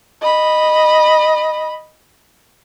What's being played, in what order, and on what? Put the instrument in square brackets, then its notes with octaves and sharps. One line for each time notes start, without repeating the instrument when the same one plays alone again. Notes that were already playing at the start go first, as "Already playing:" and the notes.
[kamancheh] D#5 B5